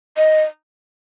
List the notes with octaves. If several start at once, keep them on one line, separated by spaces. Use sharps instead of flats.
D#5